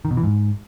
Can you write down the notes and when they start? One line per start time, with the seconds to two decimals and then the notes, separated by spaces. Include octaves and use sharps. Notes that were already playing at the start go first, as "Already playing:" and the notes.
0.05 D#3
0.11 B2
0.17 E3
0.23 G#2